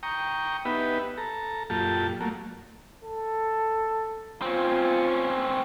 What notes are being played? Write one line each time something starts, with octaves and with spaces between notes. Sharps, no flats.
G5 A#5 C#6 D#6
B3 D#4 G4 B4 E5 F#5
A4 A#5
F#2 A#2 F4 G4 A4 A5
F#3 A3 A#3
A4
C4 C#4 F4